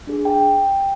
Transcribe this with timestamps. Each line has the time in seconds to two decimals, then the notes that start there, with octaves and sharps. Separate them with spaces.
0.07 D4 G#4
0.25 G5